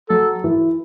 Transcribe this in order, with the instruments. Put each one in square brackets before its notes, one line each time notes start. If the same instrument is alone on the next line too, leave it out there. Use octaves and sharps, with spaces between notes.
[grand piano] F#3 [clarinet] A4
[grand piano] E3